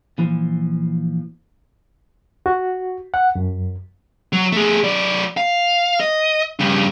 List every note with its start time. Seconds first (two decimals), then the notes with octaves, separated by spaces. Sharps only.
0.18 A#2 E3 F3
2.46 F#4
3.14 F#5
3.35 F#2
4.33 F#3
4.52 A3 G#4
4.84 F#3 D5
5.37 F5
6.00 D#5
6.59 G2 C#3